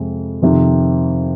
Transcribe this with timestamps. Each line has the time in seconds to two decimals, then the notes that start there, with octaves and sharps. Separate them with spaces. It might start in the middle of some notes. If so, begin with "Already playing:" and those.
Already playing: F2 C3 G#3
0.42 F2 C3 D#3